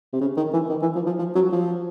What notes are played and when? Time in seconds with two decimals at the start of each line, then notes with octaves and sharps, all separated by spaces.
0.13 C3
0.21 C#3
0.37 D#3
0.53 E3
0.69 D#3
0.82 E3
0.95 F3
1.07 F3
1.19 F3
1.35 F#3
1.52 F3